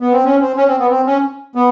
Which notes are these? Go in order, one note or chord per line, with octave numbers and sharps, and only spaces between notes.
B3
C4
C#4
C4
C#4
C4
B3
C4
C#4
B3